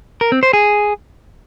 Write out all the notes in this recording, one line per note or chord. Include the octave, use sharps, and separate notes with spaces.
A#4
C4
C5
G#4